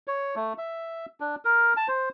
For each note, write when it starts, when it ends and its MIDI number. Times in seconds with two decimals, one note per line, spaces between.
0.07 0.35 73
0.36 0.53 57
0.58 1.06 76
1.20 1.35 62
1.45 1.74 70
1.77 1.88 81
1.88 2.09 72